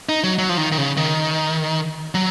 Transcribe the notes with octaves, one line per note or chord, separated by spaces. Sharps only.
D#4
F#3
F#3
F3
D#3
D#3
C#3
D#3
F#3